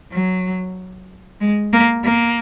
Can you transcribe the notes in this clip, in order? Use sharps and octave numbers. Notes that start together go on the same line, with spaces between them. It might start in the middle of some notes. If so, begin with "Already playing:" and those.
F#3
G#3
A#3
A#3